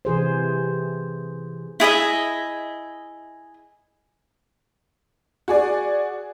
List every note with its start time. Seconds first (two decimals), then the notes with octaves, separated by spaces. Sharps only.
0.05 C3 E3 G#4 C5
1.80 E4 G#4 D#5 E5
5.48 F#4 G#4 D5